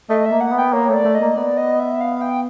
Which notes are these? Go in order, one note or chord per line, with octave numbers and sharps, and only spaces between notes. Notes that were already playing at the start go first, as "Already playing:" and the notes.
A3 D#5
E5
A#3
F#5
B3
G5
A#3 C#5
A3 D5
A3
D#5
A#3
B3 D5
D#5
E5
F5
G5